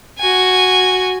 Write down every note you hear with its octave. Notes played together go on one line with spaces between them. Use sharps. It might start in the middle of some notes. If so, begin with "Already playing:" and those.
F#4 G#5